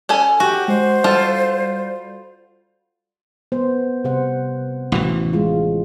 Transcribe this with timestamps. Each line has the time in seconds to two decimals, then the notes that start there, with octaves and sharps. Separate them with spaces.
0.09 C#4 A4 G#5
0.40 F#4 G4
0.68 G#3 C5
1.04 G3 F4 A4
3.52 B3 C5
4.04 C3 C5 F#5
4.92 A1 B2 E3
5.33 G#3 F4